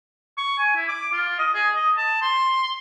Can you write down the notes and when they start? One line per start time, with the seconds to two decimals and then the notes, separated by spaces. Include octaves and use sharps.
0.37 C#6
0.58 G#5
0.76 E4
0.88 D6
1.13 F4
1.38 D#5
1.54 G#4
1.75 D#5
1.97 A5
2.22 C6